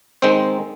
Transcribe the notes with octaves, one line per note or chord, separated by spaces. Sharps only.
D#3 G#3 C4 C5